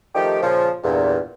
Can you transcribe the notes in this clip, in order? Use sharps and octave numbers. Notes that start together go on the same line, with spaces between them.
D#3 F3 A3 D#4 G4
A#2 C#3 F3
E2 G2 A#2